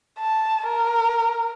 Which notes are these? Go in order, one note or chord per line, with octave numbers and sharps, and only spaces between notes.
A5
A#4